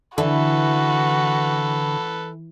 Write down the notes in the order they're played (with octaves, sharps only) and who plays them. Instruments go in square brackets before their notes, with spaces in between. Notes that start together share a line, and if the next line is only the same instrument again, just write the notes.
[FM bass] D3 [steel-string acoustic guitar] E3 [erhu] F#4 [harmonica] A4 B4